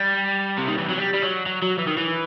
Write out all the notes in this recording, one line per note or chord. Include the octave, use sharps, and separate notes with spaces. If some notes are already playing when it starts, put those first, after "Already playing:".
Already playing: G3
C3
D#3
E3
F#3
G3
G3
F#3
F#3
F#3
E3
D#3
E3